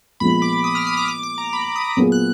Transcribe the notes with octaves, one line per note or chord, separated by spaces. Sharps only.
A#2 F3 G#3 B3 B5
D6
D#6
F6
D#6
D6
D6
D6
A#5
B5
D#6
A#2 F#3 B3 F4 G#4
F#6